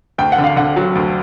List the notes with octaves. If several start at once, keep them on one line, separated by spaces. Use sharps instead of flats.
D2 G5
F#5
D3
F5
D3 F#5
F#3
D2